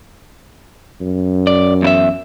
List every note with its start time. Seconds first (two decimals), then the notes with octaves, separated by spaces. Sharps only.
1.01 F#2
1.47 D5
1.82 E2 E4 E5